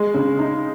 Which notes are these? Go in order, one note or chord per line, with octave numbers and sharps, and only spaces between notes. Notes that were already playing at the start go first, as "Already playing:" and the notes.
Already playing: G#3
C#3
D#4